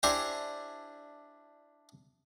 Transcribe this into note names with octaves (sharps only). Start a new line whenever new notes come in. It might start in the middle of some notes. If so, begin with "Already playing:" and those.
D4 E4 G4 C5 G#5 A#5